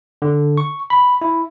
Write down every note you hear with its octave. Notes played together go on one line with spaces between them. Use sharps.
D3
C#6
B5
E4